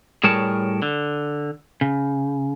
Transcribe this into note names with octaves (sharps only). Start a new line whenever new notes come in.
A2 G3 G#4 A#4 C#5 A5
D3
C#3